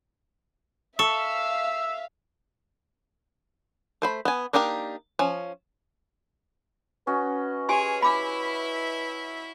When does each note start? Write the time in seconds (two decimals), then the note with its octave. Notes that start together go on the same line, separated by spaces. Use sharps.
0.99 A4 E5 F5 C#6 E6
4.02 A3 C5 B5
4.25 B3 G#5
4.53 A#3 D4 D#4 G4 A#4
5.19 F3 C#4
7.07 C#4 F#4 B4 D#5
7.69 G4 G#4 C#5 G#5 C6
8.02 E4 E5 B5 D6